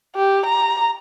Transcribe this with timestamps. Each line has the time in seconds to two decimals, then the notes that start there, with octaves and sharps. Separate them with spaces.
0.16 G4
0.46 A#5